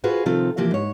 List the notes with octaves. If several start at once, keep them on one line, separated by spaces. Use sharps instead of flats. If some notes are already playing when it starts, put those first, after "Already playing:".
F4 F#4 G#4 B4 C5
C3 D#3 F3 C4 F4 A4
C3 E3 F3 A#3 G4
G#2 C#5